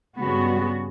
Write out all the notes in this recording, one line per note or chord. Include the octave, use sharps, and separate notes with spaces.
G2 C#3 B3 F#4